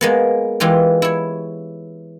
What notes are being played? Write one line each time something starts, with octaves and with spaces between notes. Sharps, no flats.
G#3 A#3 B3
E3 G#3 F4 G4
E4 C#5